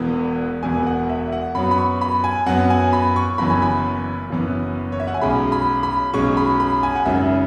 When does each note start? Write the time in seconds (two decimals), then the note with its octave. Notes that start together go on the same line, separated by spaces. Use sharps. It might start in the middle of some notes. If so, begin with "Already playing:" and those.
Already playing: E1 E2 E3 B3
0.63 E1 E2 E3 B3 G#5
0.87 F#5
1.09 E5
1.32 F#5
1.55 F#2 F#3 B3 B5
1.71 B5
1.78 C#6
2.01 B5
2.24 G#5
2.46 F#2 F#3 B3 F#5
2.70 G#5
2.93 B5
3.16 C#6
3.38 F#1 F#2 E3 B3 B5
3.50 G#5
3.62 B5
4.30 F#1 F#2 E3 B3
4.92 C#5
5.00 E5
5.08 F#5
5.14 G#5
5.21 B1 B2 G#3 C#4 B5
5.52 B5
5.83 B5
6.13 B1 B2 G#3 C#4 C#6
6.37 B5
6.60 B5
6.83 G#5
6.95 F#5
7.05 G#1 F#2 C#3 E5